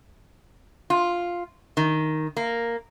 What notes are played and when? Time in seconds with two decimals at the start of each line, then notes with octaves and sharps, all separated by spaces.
0.90 F4
1.77 D#3
2.37 A#3